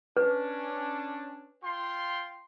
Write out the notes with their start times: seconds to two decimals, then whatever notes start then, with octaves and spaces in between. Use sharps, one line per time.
0.17 C#4 D4 B4
1.63 F4 G5 C6